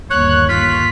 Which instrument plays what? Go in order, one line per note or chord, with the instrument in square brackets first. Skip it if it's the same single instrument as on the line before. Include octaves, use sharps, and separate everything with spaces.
[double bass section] G1 D#2 A#3 [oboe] C#5 [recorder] F#6
[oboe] F4 [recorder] B6